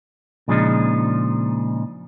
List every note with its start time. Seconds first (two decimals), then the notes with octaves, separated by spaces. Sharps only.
0.48 A#2 C#3 F3 G#3 D4 D#4